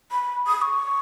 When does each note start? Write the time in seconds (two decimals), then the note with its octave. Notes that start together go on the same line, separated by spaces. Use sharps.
0.12 B5
0.47 D#6
0.62 C#6